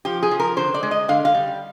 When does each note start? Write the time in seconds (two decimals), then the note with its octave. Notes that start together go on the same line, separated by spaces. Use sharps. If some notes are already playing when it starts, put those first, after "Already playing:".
0.05 F3 G4
0.23 G#4
0.31 F3
0.40 A#4
0.57 D3 C5
0.74 D5
0.83 G#3
0.91 D#5
1.08 D3 F5
1.25 F5
1.35 G3